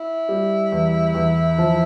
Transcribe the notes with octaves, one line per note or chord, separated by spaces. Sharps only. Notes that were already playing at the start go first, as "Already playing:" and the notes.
Already playing: E4
G3
E2
E2
F3